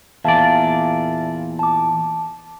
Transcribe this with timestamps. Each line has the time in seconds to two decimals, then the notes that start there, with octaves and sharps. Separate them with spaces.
0.24 E2 A#2 D5 E5 F5 A5
1.59 A5 D6